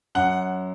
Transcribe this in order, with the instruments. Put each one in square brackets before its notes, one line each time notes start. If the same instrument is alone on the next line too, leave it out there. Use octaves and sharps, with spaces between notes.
[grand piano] F#2 F#5